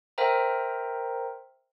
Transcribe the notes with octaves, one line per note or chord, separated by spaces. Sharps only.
A#4 C5 E5 G5 A#5